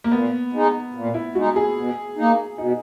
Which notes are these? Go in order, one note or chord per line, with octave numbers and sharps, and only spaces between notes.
A#3
A#2 B3
G#3 D#4
A#2
E4
G#3 D#4 F#4
G#4
B2
A#3 D#4
B2 D#4